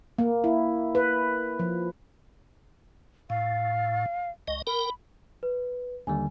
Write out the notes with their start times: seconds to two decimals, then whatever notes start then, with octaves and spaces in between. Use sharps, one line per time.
0.18 A#3
0.44 E4
0.95 B4
1.59 F3
3.30 A2 F5
4.48 C#2 D#5
4.67 A#4 G5 B5
5.43 B4
6.07 D#2 D3 G3 G#5